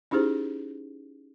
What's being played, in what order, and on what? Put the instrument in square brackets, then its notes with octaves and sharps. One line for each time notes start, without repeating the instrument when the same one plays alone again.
[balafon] C#4 D#4 E4 G4 G#4 C5